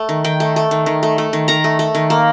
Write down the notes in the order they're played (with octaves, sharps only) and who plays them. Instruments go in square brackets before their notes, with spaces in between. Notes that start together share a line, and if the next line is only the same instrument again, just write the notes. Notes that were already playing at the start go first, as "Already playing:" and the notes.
Already playing: [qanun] A3
D#3
D#3 G5
A3
A3
D#3
D#3
A3
A3
D#3
D#3 A#5
A3
A3
D#3
A#3